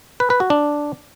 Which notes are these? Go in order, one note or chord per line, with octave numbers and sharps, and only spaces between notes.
B4
B4
F#4
D4